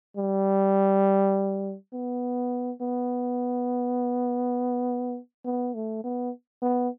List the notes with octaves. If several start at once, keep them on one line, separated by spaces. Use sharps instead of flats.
G3
B3
B3
B3
A3
B3
B3